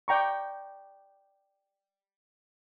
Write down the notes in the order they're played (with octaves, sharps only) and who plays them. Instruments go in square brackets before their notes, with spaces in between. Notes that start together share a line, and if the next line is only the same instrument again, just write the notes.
[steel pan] D5 G5 A#5 C#6